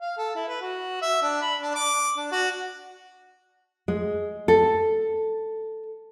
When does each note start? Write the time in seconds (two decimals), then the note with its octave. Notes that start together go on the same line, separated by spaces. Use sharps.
0.01 F5
0.18 A4
0.35 E4
0.48 B4
0.61 F#4
1.01 E5
1.22 D4
1.42 B5
1.61 D4
1.75 D6
2.17 D4
2.31 F#4
3.88 G#3
4.48 A4